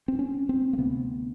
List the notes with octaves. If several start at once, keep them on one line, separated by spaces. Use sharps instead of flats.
C4
C#4
C4
A#3
D2 C3 B3